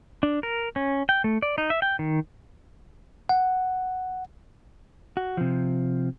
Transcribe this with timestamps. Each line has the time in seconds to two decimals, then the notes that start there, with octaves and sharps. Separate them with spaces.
0.23 D4
0.43 A#4
0.76 C#4
1.09 G5
1.24 A3
1.42 D5
1.58 D#4
1.70 E5
1.82 G5
1.99 D#3
3.29 F#5
5.17 F#4
5.37 C3 F3